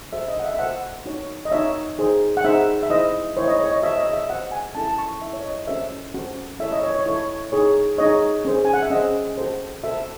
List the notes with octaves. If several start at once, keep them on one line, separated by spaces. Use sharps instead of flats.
F#4 A4 C5 E5
D#5
F#5
E5
E5
F#4 A4 C5 F#5
D#4 F#4 C#5
D#5
D#4 F#4 C#5 E5
D#4 G#4 C5
F#5
D#4 G#4 C5 E5
E5
E4 C5 D#5
E4 C5 C#5
D#5
C#5
D#5
F#4 C5 E5
D#5
E5
F#4 C5 F#5
G#5
C#4 E4 A4 A5
A5
C#6
C#4 E4 A4 E5
C#5
D#5
C#4 F#4 A4 C5 E5
C#4 F#4 A4 C5
E4 A4 C#5 E5
D#5
C#5
C#5
E4 A4 C#5
D#4 G#4 C#5
D#4 G#4 C#5 D#5
C#4 G#4 C5
G#5
F#5
E5
C#4 G#4 C5 D#5
F#4 A4 C5
F#4 A4 C5 E5